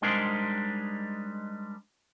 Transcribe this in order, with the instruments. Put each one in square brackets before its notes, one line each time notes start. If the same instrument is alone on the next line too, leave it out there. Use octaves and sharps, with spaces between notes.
[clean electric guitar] G3 G#3 D4 D#4 A#4 C5